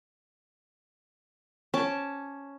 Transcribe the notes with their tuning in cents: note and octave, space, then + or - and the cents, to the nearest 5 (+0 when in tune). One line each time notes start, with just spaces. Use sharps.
C#4 +0 A5 +0 D6 -5